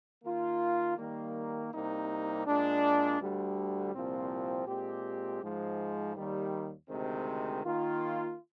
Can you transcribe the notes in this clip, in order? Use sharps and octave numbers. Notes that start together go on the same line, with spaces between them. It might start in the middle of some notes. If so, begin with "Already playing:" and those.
D#3 A#3 F4
D#3 G3 A#3
C2 C3 G3 A#3 D#4
A#2 G#3 D4
D2 D3 G3
C2 A#2 F3 C4
A#2 G#3 C4 G4
G#2 F3 G#3
D#2 D#3 G3
D2 C3 D#3 G#3 C4
D#3 A#3 F4